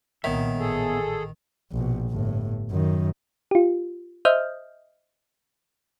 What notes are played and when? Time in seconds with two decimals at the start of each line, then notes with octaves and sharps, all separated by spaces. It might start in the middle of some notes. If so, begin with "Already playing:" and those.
0.24 C2 A#2 D#3 B3 C#5 E5
0.58 A1 G#4 A4
1.72 A#1 B2
2.09 G1 A2
2.71 F#2 D#3
3.51 F4 G4
4.25 C5 D#5 E5 D#6 F6 G6